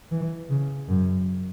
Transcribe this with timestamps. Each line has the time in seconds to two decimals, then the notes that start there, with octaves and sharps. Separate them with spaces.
0.11 E3
0.50 C#3
0.88 F#2